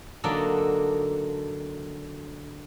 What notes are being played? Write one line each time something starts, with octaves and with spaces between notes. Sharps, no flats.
D3 F#3 A#3 D4 D#4 A4